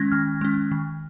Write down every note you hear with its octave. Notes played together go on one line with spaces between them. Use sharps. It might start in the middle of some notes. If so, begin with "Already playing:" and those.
Already playing: D#3 G#3 C#4 G#6 A#6
D#3 F6
G#3 C#4
D#3